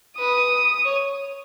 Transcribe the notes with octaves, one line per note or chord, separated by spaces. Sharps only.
B4 D#6
C#5